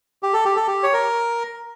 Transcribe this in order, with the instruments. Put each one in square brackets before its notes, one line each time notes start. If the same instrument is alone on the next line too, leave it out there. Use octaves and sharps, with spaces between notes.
[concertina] G4
A4
G4
A4
G4
C#5
A#4